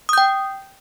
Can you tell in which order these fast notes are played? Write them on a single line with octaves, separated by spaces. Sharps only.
D#6 G6 G5